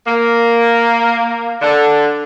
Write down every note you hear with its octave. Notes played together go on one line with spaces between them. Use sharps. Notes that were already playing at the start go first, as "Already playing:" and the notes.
A#3
D3